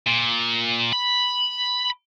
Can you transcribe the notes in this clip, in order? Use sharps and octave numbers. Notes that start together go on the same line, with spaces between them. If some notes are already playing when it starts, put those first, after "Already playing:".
A#2
B5